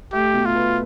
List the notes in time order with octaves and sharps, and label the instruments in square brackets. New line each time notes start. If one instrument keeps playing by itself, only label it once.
[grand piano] A3 [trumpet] G4
[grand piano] B2
[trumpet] F4
[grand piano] B4